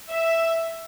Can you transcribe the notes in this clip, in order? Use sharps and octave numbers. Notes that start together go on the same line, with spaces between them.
E5